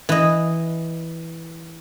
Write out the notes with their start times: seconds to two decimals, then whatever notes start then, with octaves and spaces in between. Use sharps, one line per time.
0.09 E3 D#5